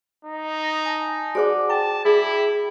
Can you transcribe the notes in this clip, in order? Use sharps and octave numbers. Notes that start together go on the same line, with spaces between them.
D#4
G#5 A5
F#4 G#4 C5 D5 F#5 D6
G5 A5
E4 G#4